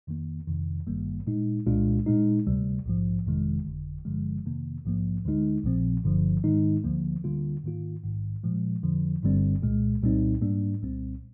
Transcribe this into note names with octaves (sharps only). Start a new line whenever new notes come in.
F2 D#3 A#3
F2 C3 D#3
G#1 G2 D#3 G3 A#3
A#2 G#3 D#4
C2 A#2 G#3 D4 F4
A#2 G#3 D#4
D2 C3 G3
A#1 G#2 F3
G1 F2 C3 D#3 G#3
G1 F2 D3
G1 G2 D3 F3 G#3
F2 C3 D#3 A#3
A#1 G#2 F3 A#3
D2 D3 G#3 D#4
A#1 A#2 F3 C4
G1 G2 D3 F3
G#2 D#3 G#3 D#4
D2 D3 F3 A#3
D2 D3 G3 A#3 F4
G#2 D#3 A#3 F4
A#1 G#2 D#3
A#2 F3 G#3
F2 D3 F3
G1 G2 D3 G3 C4
C2 A#2 G#3
C2 A#2 G3 C4 D#4
G#2 G3 A#3 D4
C2 A#2 G3 C4